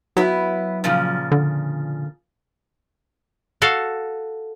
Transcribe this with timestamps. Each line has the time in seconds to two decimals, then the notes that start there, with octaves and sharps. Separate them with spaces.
0.17 F#3 B3 E4
0.84 A#2 C#3 F3
1.32 D3
3.62 F#4 A4 F5